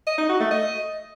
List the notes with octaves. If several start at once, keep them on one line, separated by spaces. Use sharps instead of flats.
D#5
D#4
F#4
A3
D#5